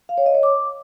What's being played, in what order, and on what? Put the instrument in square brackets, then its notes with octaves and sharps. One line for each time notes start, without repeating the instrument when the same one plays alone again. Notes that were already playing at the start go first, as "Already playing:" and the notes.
[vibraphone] F5
C#5
D#5
C#5
D6